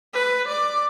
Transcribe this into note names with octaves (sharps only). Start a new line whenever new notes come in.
B4
D5 D6